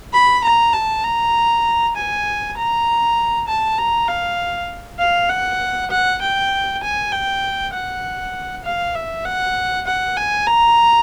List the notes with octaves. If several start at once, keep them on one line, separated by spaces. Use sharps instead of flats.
B5
A#5
A5
A#5
G#5
A#5
A5
A#5
F5
F5
F#5
F#5
G5
G#5
G5
F#5
F5
E5
F#5
F#5
G#5
A#5